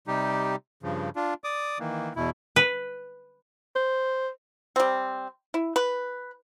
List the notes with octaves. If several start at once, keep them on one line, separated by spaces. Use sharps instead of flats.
C3 G3 D#4 G4
G2 C#3 F3
D4 F4
D5 D6 D#6
D#3 E3 A#3
E2 B2 E4
B4
C5
G3 C4
E4
B4